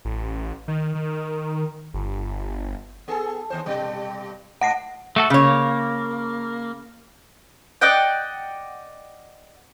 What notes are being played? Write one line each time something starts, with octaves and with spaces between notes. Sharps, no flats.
A1
D#3
D#3
G1
B3 G#4 A4
D#2 C5
G2 B2 G3
G#2 F#5 A#6 C7
A3 F#4 A4
C#3 A#3 C#5
D5 D#5 F#5 G5